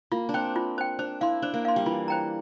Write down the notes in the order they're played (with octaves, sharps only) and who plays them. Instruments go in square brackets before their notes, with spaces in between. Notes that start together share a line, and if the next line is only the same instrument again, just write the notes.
[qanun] A#3 [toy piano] F4
[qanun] D4
[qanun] C4 [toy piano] C5 G5
[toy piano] F4
C5 G5
[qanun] D4 [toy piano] C5
[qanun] E4 [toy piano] F5 C6
[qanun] D4 [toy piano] C5
[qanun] A#3
[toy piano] F5 C6
[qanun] G3
[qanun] E3 [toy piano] F4
[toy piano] C5 G5 A#5